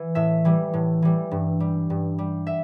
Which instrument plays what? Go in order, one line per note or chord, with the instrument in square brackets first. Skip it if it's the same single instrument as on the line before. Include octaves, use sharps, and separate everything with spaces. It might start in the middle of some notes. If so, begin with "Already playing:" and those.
Already playing: [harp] E3
A2 E5
E3 G3
A2
E3 G3
G2
G3
G2
G3
E5